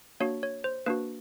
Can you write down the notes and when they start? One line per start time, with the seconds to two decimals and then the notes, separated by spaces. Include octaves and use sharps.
0.20 A#3 D4 F#4 C#5
0.43 C#5
0.64 C5
0.86 A#3 D4 F#4 B4